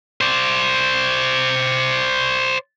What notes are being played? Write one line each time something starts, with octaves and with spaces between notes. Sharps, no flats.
C5 D5